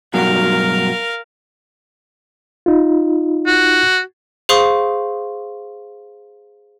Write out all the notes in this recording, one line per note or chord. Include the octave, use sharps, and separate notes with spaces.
G2 B2 F#3 A#4 F5
D#4 F4
F#4
G#4 C5 F5 C6 C#6 D#6